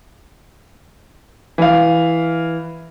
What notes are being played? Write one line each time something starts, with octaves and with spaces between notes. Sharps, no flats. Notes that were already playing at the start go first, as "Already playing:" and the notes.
E3 F5